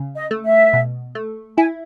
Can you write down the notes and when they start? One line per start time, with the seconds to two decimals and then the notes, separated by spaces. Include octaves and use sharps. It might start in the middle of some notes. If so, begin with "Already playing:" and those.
Already playing: C#3
0.16 D#5
0.31 A3
0.45 E5
0.73 B2
1.15 A3
1.58 E4 G#5